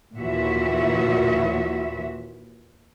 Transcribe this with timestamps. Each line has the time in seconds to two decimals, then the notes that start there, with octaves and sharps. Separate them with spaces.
0.16 D#2 A#2 E3 F#4 E5